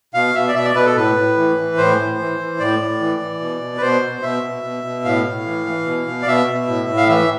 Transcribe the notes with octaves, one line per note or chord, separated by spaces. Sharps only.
B2 F5
B2 E5
D5
B2 E5
D5
B2 B4
A4
A2 B4
A2
E3
E3
A2 C5
A2
E3
E3
A2 D5
A2
E3
E3
B2
B2
B4
B2 C5
B2
B2 E5
B2
B2
B2
A2 F5
A2
E3
E3
B2
B2
D5
B2 E5
B2
A2
A2
F5
E3 E5